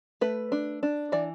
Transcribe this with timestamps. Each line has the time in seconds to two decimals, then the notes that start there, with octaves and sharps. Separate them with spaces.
0.21 A3 B4
0.52 D4
0.83 D4
1.12 E3 D5